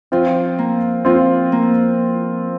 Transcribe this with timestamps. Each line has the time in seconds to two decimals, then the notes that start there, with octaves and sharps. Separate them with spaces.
0.12 F3 C4 F4
0.59 A#3
1.05 F3 C4 F4
1.52 A#3